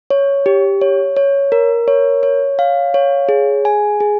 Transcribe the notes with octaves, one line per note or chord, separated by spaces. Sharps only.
C#5
G4
C#5
C#5
A#4
C#5
C#5
F5
C#5
G#4
G#5
G#4